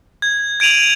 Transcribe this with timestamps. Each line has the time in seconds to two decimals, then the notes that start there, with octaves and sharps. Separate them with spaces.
0.22 G#6
0.60 G#6 D7 D#7 F7 F#7